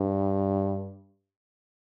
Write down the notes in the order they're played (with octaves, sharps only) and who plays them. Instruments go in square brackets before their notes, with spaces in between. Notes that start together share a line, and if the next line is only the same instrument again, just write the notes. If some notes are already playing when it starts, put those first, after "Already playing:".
Already playing: [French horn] G2